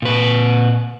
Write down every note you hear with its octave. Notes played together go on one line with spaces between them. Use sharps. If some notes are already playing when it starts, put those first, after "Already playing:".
A#2 B4